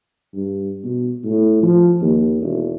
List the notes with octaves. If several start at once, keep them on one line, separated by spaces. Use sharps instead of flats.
G2
B2
A2
F3
D#2
E1